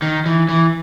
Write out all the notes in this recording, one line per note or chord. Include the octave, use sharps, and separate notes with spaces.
D#3
E3
E3